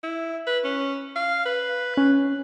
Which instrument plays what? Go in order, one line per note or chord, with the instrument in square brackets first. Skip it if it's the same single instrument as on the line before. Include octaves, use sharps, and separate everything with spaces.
[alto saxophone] E4
B4
C#4
F5
B4
[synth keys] C#4 F#6